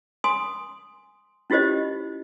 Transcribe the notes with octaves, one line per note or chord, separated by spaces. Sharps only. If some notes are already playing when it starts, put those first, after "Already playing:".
G#5 C6 D#6
C#4 E4 F4 G4 C5 D#5